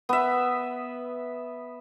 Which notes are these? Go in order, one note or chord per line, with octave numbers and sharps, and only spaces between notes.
B3 E5